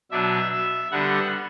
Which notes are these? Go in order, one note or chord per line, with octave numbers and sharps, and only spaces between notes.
B2 F#3 B3 D4 E5
E5
D3 G3 B3 D4 F#5